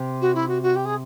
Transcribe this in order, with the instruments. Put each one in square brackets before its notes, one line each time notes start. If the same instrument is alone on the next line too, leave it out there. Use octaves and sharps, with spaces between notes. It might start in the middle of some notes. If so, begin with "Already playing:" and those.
Already playing: [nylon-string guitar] C3
[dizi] F#4
E4
F#4
F#4
G4
G#4